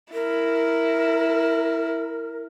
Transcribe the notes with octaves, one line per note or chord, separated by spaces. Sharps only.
E4 A#4